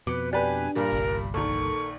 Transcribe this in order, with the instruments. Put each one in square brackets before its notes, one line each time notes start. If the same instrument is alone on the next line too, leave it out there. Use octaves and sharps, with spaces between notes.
[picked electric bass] F2 B2 [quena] B4 [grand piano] D6 C#7
[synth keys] D4 [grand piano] G4 B4 [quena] G#5
[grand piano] G2 A#2 G3 [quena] A#4
[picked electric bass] G1 C2
[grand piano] A#1 D#3 [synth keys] A4 A#4 [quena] C#6